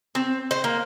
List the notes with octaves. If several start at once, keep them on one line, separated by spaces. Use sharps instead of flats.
C4
C5
A#3